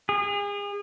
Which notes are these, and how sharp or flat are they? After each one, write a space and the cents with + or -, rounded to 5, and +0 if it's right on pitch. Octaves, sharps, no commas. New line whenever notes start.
G#4 -35